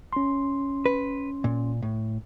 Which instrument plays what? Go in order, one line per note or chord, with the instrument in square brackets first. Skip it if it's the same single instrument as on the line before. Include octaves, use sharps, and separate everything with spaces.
[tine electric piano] C#4 C6
[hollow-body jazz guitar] B4
A#2
A2